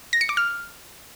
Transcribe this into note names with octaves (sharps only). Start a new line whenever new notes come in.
A#6
C#7
D6
F6